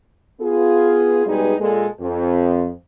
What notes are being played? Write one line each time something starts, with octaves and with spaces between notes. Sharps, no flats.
B3 F4 G#4
B2 G3 G#3 D#4 G#4 B4
A#2 G#3 A4
F2